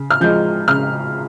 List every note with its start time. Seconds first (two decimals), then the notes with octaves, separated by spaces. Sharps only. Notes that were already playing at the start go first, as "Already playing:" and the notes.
Already playing: C#3
0.11 F6
0.21 F3 G#3 G6
0.68 C#3 F6